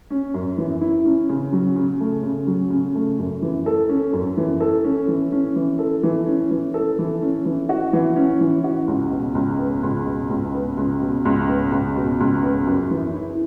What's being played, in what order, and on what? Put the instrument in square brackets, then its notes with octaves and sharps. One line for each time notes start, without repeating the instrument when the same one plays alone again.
[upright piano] C#4
F#2
E3
E4
C#4
C#3
F#3
C#3
A3
C#3
F#3
C#3
A3
F#2
E3
A4
C#4
F#2
E3
A4
C#4
E3
C#4
E3
A4
E3
C#4
E3
A4
E3
C#4
E3
F#4
E3
C#4
E3
F#4
C#2
B2
C#2
B3
C#2
B2
C#2
B3
C#2
B2
C#2
B3
C#2
B2
C#2
B3
F#2
E3
E4